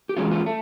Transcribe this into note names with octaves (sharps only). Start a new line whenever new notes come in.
G4
E3 G#3 C#4 F4 F#4
F4
A3